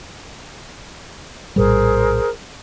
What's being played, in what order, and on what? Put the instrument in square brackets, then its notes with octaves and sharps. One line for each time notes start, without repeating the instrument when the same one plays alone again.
[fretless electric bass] A#1 A2 G3 [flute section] G#4 A#4 C5